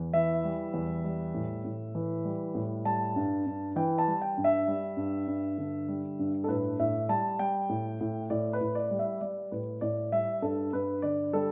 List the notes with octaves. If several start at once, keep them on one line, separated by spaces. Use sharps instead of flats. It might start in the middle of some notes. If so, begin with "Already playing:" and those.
Already playing: E2
E3 E5
G3
E2
G3
A2
A2
E3
G3
A2
G3 A5
G2
G2
E3 G5
A5
G3
G5
G2
E5
G3
G2
G2
D3
G3
G2
A4
A2 B4
A2 E5
G3 A5
G3 G5
A2
A2
A2 D5
B4
A2
D5
G3
E5
G3 D5
A2 B4
A2 D5
G3 E5
G2 A4
G2 B4
D3 D5
G3 A4